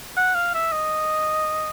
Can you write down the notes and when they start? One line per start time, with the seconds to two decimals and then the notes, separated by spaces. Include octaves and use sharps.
0.17 F#5
0.35 F5
0.54 E5
0.72 D#5